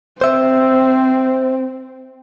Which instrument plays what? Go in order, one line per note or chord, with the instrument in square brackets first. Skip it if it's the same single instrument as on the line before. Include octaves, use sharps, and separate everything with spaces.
[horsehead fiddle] C4 [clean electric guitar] C5 E5